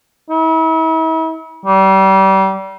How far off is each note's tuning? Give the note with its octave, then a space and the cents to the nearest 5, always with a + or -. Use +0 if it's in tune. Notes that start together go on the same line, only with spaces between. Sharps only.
E4 -40
G3 -30